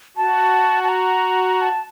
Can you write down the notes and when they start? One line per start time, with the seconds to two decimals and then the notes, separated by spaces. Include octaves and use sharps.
0.17 F#4 A5
0.84 A5
0.89 A#5
1.61 A5